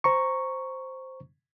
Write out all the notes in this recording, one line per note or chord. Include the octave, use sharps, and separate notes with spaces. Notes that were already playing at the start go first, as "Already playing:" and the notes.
C5 A#5 C#6